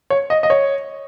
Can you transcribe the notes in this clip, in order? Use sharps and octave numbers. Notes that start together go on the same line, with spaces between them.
C#5
D#5
D#5
C#5